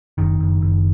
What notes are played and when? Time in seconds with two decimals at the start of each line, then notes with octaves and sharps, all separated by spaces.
0.18 F#1 D#3
0.39 F#1
0.61 F#1